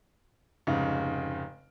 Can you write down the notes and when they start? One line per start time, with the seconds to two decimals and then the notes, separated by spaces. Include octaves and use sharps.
0.67 F1 G#2 C#3